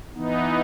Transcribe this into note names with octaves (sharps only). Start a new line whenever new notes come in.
E3 B3 D#4